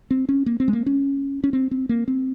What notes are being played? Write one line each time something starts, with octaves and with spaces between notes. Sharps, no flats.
C4
C#4
A#3
C4
G#3
A#3
C#4
C#4
C4
C4
A#3
C4